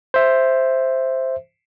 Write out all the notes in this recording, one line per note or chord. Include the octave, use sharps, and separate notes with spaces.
C5 E5